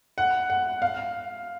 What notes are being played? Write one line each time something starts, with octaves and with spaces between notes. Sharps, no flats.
F#5
F#5
F5